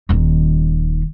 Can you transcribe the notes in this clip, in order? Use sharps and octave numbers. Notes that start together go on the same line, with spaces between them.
D#1 D#3